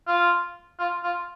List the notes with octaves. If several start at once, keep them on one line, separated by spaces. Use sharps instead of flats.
F4
F4
F4